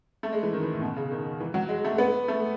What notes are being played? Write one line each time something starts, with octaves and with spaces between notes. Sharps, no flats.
A3
G#3
E3
D#3
E3
A2
B2
C#3
D#3
E3
F#3
G#3
A3
B3
A3